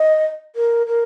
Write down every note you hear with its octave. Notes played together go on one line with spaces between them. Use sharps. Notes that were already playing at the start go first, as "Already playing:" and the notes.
Already playing: D#5
A#4
A#4